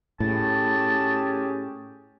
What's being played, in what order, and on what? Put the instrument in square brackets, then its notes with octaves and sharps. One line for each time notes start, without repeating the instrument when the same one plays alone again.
[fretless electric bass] A2 [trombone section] C#4 G4 G#4 [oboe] A5